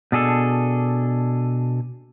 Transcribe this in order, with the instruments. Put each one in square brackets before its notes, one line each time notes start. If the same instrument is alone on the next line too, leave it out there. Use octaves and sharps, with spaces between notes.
[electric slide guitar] B2 D4 G#4 A4